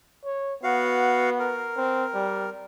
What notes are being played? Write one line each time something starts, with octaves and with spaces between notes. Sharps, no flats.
C#5
B3 F#4 F5
A#4
C4
G3